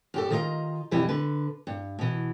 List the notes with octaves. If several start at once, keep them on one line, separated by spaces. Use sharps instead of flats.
F#2 G4 A4
D#3 F4 D#5 F5 A#5
F2 B2 E3 G3 E4
D3 B4
G2
B2 E3